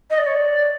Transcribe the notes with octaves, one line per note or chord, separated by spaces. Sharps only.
D#5
D5
C#5
D5